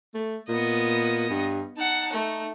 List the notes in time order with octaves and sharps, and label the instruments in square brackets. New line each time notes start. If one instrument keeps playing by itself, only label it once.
[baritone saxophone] A3
[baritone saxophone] A#2 [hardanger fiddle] B3 D#5
[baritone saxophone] G2
[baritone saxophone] D#4 [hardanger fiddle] F#5 A5
[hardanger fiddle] A3